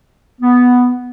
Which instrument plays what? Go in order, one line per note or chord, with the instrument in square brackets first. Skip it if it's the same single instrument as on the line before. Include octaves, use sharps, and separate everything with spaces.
[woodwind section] B3